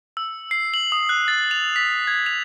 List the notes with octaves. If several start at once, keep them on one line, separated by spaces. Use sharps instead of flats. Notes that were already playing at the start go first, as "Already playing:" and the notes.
E6
C7
F#7
D#6
F#6
A6
F7
B6
G#6
F7